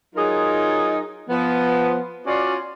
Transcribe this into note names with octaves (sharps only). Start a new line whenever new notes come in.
F#3 D#4 F4 G#4 A#4
F3 B3
C#4 F4 F#4 D5